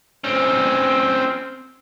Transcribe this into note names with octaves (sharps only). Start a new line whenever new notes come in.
C4 C#4